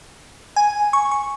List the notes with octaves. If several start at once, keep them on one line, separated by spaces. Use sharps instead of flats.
G#5
C#6
C#6